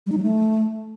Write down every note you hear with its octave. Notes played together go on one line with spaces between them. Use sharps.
G3
D#4
F#3
A3